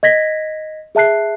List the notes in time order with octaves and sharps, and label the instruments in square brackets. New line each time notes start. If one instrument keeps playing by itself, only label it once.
[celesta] D#5 G#6 A#6 B6
G#4 E5 A5 F#6 C7